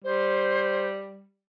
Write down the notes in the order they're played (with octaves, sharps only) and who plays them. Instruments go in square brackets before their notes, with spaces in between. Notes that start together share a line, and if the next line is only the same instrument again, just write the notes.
[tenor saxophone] G3 [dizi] C5